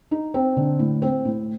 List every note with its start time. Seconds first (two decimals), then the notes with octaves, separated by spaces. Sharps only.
0.11 D#4
0.34 C4
0.57 D3
0.79 A2
1.02 C4
1.25 A2